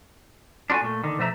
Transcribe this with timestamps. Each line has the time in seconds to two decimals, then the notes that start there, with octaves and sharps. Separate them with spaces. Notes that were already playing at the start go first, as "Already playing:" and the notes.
0.70 D4 F4 F#4 A4 G#5
0.82 A#2 A3
1.04 D3 D#3
1.18 B2 F3 A3 E5 A#5